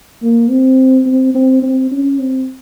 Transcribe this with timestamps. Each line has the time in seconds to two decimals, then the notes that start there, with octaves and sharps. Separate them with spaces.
0.22 A#3
0.50 C4
1.06 C4
1.35 C4
1.62 C4
1.91 C#4
2.19 C4